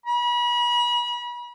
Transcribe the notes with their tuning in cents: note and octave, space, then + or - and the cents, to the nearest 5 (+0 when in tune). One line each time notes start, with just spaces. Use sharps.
B5 -35